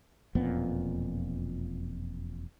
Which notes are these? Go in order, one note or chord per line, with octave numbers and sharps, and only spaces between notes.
E1 F2 A#2 B3